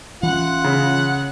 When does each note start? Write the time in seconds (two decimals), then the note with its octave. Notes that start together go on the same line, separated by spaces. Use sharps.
0.23 E3 C#4 F4 F#5
0.64 C#3